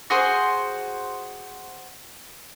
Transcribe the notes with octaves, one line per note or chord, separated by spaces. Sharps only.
F#4 G#4 C5